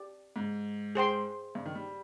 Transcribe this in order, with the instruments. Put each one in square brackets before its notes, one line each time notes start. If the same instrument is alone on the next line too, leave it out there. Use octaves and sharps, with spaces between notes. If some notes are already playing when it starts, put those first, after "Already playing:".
Already playing: [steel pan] G4 D5
[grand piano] G#2
[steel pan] G#4 C5 G5 C6
[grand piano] G2
D#3
G3